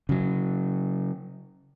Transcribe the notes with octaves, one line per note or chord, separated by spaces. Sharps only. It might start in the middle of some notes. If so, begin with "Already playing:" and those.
C#3 F#3